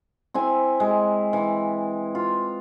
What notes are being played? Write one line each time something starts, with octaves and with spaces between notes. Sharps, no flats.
C4 E4 G#5
G#3
E3
F4